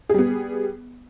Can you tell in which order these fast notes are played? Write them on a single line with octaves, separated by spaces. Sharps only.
G#4 G3 B3